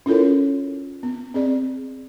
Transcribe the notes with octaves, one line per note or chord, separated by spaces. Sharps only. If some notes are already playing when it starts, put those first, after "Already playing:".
C#4 E4 F4 A4 A#4 C#5
B3
C4 G#4 D5